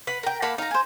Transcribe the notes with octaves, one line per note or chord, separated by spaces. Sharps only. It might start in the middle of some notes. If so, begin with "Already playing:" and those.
B4 F#5
A#4 G5
A#3 F5 F#5 A5 B5
D#4 F5 A#5
C5 G#5